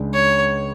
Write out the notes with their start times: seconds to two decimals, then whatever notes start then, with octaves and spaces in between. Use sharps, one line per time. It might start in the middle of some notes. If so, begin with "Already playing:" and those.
Already playing: C#2 C#3 G#3 D4 G#4
0.14 C#5